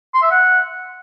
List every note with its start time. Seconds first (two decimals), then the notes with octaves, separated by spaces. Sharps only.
0.14 C6
0.23 E5
0.31 F#5